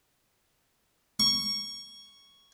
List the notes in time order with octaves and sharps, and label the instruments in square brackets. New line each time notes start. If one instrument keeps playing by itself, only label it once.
[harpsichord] C#6